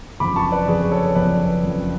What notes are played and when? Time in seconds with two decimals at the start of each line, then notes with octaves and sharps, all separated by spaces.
0.20 F#1 F2 F3 B5 D6
0.36 A5 C#6
0.52 B4 D5
0.68 F#1 F2 F3 G#4 B4
0.91 A4 C#5
1.15 F#1 F2 F3 B4 D5
1.63 F#1 F2 F3